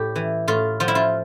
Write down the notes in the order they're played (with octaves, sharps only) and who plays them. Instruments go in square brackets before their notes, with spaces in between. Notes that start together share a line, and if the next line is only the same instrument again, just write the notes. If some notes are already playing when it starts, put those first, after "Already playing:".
Already playing: [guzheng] A2 G4
E3
A2 F4
F3 F4
E4
F4